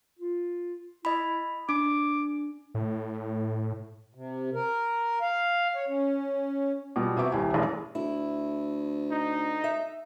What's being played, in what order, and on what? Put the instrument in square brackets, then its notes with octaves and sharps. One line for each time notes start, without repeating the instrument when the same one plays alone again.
[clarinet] F4
[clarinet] E4 [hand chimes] D#5 B5
[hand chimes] D4 [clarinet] D6
[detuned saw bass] A2
[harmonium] C3
A#4
F5
C#5
C#4
[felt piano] B2 G3 F4
C3 B3 F#4 E5 D6
D#1 C2 G4 G#5
E1 A1 D4 G#4 A#4
[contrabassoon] D2 [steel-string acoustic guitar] E4
[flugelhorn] D#4
[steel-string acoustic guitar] E5